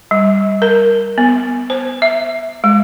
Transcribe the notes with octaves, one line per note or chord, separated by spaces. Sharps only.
G3
A#4
B3
C5
E5
G#3